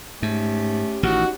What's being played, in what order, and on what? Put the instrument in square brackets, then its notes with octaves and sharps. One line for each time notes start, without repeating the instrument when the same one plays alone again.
[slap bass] G#2 [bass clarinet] A3 [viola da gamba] C#4 G4
[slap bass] A1 D#3 [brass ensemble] D#4 F#4